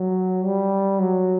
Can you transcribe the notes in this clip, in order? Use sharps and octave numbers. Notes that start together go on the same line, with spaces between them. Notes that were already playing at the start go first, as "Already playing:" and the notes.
Already playing: F#3
G3
F#3